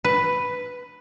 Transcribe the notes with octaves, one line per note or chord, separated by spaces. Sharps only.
B4